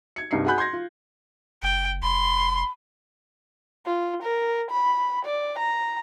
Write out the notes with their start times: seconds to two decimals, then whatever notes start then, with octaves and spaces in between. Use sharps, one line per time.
0.16 G#6 C#7
0.31 C2 G2 D#4 C7 C#7
0.46 G#4 F#5 G#5 B5 F#6 G6
0.58 C6 G6 G#6 A#6
0.73 F4
1.63 F#1 G5
2.02 F1 B5 C6
3.86 F4
4.22 A#4
4.71 B5
5.25 D5
5.58 A#5